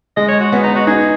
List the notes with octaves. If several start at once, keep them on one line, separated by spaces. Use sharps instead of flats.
G#3 D#5
C#5
F#4
B3 C#4
D#4
F#4
D#4 G#4